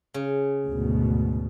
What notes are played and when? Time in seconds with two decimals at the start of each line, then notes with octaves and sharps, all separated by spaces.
0.14 C#3
0.66 D2 G#2 B2